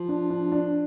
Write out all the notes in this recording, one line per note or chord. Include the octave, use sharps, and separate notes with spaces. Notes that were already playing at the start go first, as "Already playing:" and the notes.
Already playing: F3
D4
D4
D4